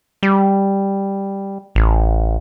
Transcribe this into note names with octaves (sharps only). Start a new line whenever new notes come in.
G3
A1